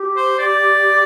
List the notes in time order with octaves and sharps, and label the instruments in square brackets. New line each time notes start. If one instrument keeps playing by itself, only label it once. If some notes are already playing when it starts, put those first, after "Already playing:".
Already playing: [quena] G4
[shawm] C5
D5